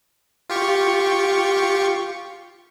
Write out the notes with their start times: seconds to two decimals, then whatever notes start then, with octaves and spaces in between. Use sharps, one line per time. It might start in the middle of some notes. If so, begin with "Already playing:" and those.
0.50 F4 G4 C#6